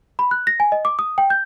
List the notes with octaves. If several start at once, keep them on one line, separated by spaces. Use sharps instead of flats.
B5
F#6
A#6
G#5
D#5
D6
D#6
G5
G6